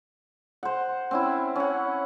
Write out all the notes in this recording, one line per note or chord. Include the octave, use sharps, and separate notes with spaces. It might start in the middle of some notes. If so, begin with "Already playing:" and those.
C5 F#5
C4 C#4 E4
C#4 F#5